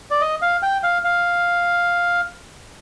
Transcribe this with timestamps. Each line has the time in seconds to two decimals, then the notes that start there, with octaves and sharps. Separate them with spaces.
0.11 D5
0.21 D#5
0.42 F5
0.63 G5
0.83 F5
1.04 F5